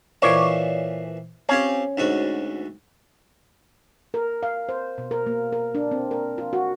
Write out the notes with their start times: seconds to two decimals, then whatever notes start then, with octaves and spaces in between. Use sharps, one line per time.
0.22 A#2 E3 F3 C#5 D5
1.49 C4 C#4 F4 G4
1.97 D2 G#2 F#4
4.14 A#4
4.43 F5
4.69 C5
4.98 B2
5.11 A#4
5.26 A#3
5.52 A#4
5.75 D4
5.91 C4
6.11 A#4
6.38 F4
6.53 F#4